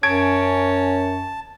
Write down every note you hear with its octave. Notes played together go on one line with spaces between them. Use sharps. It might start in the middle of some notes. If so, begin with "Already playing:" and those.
F#2 C#4 A5 G#6 D7